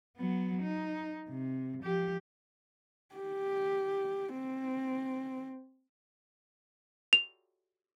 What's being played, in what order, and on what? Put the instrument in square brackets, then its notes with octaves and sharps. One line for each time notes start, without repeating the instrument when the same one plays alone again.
[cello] F#3 B3
D#4
C3
F3 G4
[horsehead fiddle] G4
C4
[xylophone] F7